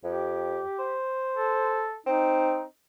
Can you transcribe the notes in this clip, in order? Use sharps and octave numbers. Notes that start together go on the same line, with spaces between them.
F2 G4
C5
A4
C4 D#4